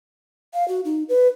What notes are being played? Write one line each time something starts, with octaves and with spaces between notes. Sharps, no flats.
F5
F#4
D#4
B4